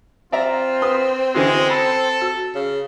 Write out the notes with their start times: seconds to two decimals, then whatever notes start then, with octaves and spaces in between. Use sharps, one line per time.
0.32 C4 F4 D5 E5 A#5
0.82 B4 C6 D#6
1.35 D3 E3 G#3 C#4 F#4
1.70 A4 B5
2.22 F#4
2.55 C#3